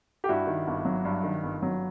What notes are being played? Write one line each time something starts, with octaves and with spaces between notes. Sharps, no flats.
G4
G2 E4 F#4
D#3
G1
F#3
G2
D#3
G1
F#3